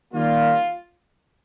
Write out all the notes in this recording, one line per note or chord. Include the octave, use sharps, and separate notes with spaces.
D#3 G3 A#3 F4